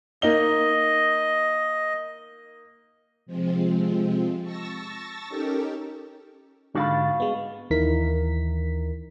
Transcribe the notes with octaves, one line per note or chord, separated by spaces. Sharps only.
A#3 D#4 D#5 G7
C3 F3 G#3 C4
A5 C#6 E6 A6 A#6
C#4 D#4 G4 A4 A#4
G#2 D3 F#4 F5 B5 A6
G#3 B3
D#2 E3 D#4 E4 A#4 B6